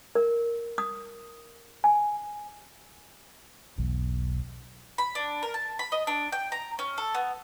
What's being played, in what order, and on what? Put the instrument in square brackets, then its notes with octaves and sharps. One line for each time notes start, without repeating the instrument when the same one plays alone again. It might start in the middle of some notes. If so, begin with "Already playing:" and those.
[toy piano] A#4
D#6
G#5
[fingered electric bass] E1 B1 E2
[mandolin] B5
D4
A#4
A5
B5
D#5
D4
G5
A#5
C#4
A4
B3